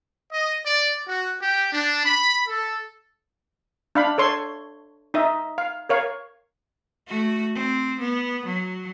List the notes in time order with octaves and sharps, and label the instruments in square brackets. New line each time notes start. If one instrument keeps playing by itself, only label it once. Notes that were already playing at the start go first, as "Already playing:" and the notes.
[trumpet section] D#5
D5
F#4
G4
D4
B5
A4
[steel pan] D4 F5 B5
A4 C#5 C6 C#6
D#4 D#5 E5
F5
A#4 C#5 F5
[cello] A3 F#4
C4
B3
F#3